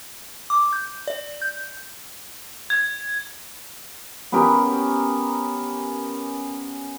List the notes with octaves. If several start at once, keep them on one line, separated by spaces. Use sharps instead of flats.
D6
G6
D5
G6
G#6
B3 C#4 G4 A#4